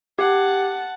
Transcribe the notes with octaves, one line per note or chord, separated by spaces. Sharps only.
G4 F#5 A5